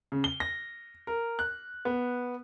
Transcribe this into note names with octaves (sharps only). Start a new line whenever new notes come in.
C#3
G7
A#6
A#4
F#6
B3